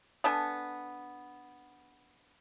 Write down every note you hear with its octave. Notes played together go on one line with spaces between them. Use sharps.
B3 D4 A4 G#5